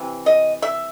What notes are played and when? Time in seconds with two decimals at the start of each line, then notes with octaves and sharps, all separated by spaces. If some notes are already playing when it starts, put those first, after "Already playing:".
Already playing: C3 E3
0.26 D#5
0.62 E5